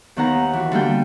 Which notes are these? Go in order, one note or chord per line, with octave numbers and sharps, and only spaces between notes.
D#2 D#3 B3 F#5 A#5
E3 F#4
D3 G3 A#3 G5